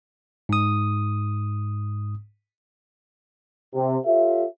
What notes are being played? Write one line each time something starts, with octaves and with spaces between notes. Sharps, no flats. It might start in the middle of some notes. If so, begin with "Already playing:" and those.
G#2 D#6
C3
F4 G4 A4 C#5 E5